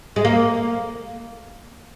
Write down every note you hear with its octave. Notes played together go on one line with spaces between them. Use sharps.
G#3
A#3